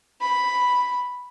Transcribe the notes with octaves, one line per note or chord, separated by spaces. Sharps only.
B5